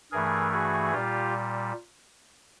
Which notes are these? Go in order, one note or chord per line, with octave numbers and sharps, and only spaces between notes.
G2 E3 A3 G#4 A#4
F#4 G#4
A#2 G3 F4 G4